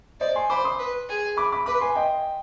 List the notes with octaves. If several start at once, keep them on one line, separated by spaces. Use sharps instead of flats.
C5 D5 D#5
G#5 C6
C5 B5 D6
C6 D#6
B4
G#4
B5 D6
B5 D6
B4 B5 D6
G#5 C6
D#5 G5